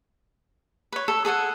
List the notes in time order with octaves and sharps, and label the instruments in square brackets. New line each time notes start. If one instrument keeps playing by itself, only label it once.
[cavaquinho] B4 C#5
A4
G#4 A4 F#5 G#5